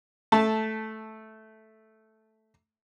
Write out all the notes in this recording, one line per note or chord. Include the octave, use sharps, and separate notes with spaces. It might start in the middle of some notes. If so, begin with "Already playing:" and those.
A3 A5